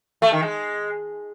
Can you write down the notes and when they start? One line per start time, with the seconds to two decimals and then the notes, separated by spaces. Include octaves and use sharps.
0.22 A3
0.32 D#3
0.42 G#3